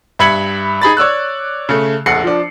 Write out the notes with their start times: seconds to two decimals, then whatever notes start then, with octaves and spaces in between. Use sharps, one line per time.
0.19 G2 E5 B5 G#6 C#7 F#7
0.81 D#4 G#4 B5 A6
0.97 C#5 D5 E6 F#6
1.69 C#3 A3
2.06 F1 A#1 F#5 C7 C#7
2.24 F3 D4